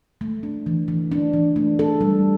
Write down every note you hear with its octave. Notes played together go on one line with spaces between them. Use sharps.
A3
D4
E3
E3
D4
E3
A3
A4
G3